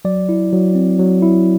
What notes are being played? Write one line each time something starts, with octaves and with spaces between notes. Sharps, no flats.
F#3 D5
E4
F#3
C4
F#3
E4